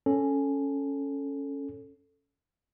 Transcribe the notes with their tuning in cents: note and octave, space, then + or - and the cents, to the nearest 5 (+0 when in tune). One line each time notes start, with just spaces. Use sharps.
C#4 +0 A4 +0